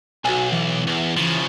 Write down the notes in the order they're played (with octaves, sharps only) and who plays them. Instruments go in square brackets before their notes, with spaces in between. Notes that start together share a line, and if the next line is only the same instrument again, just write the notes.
[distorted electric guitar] B1 [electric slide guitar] F#4 G#5
[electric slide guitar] E3
[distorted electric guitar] E2
C#3 F3